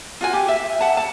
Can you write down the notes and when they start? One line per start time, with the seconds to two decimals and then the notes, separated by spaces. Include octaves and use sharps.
0.21 F4 F#4 G#5
0.33 G4
0.48 E5
0.81 F#5 A5
0.97 A5